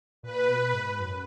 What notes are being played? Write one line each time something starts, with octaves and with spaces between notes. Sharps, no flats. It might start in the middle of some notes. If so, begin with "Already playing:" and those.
A#2 B4
B2
G#2
F#2